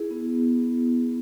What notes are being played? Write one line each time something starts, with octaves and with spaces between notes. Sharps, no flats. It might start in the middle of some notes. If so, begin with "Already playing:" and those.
Already playing: E4 G#4
B3
B3